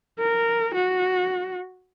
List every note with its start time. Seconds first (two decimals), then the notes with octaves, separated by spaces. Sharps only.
0.19 A#4
0.74 F#4